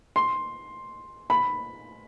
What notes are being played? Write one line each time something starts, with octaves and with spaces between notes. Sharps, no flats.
C6
B5